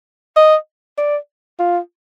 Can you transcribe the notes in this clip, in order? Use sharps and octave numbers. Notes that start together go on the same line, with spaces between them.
D#5
D5
F4